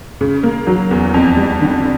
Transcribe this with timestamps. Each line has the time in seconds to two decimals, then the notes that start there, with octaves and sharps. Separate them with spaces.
0.21 C#3
0.43 A#3
0.67 F#3
0.91 E2
1.14 F2
1.36 G3
1.61 D3